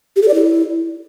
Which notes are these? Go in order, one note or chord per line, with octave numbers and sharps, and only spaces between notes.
G4
A4
D5
E4